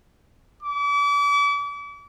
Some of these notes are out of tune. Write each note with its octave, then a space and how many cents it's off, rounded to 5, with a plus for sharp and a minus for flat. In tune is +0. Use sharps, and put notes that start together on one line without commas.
D6 -40